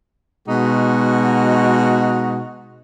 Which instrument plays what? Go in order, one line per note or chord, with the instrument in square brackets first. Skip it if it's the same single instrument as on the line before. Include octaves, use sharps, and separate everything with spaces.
[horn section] B2 G#3 D#4 F#4